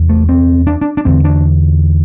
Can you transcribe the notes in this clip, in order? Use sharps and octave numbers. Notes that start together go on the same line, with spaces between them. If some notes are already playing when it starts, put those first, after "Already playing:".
Already playing: E2 C3
A3
C4
D4
D4
D4
E2 D3 C4
D4